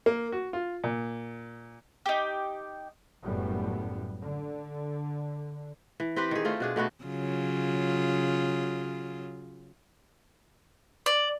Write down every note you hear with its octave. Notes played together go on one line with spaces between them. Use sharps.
A#3
F#4
F4
A#2
D#4 G4
F#1 F#2 A2 G3 B3
D3
E3
C4 G4 B4 C5
D#3 G#4
A3 C4 F4
B2 D4 G#4
B2 A3 B3 F#4
C#3 F#3 F4
D5